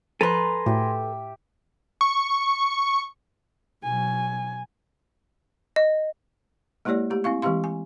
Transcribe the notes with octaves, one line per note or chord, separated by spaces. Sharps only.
F3 A4 B4 G#5 A#5 C6
A2 A3 F#4 G4 E5
C#6
B2 F#3 G#5
D#5
G#3 A#3 E4 G4 C#5 D5
A3 G4
C4 E4 F5 C#6
E3 G#3 C4 G4 F5 C6
G#5